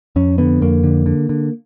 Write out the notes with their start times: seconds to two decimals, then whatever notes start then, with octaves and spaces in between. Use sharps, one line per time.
0.16 F2 C#4
0.38 D3 B3
0.61 F2 A#3
0.84 D3
1.06 D3
1.29 D3